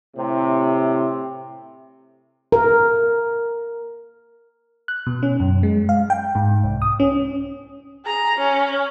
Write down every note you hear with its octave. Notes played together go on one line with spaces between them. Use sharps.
A2 C3
A#4
F#6
B2
C#4
F#2
G#3
F5
G5
G#2
C2
D#6
C#4
G#4 A#5
C#4